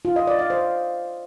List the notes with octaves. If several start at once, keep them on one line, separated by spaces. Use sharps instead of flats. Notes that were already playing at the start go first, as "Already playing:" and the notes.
F4
D#5
D5
F5
C5